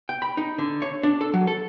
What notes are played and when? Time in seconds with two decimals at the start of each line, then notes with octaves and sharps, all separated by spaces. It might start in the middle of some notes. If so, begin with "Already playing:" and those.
0.09 G5
0.22 B5
0.37 D#4
0.58 D3
0.82 C#5
1.03 D4
1.21 A4
1.34 F#3
1.47 A4